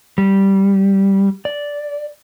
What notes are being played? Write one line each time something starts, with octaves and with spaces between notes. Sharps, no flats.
G3
D5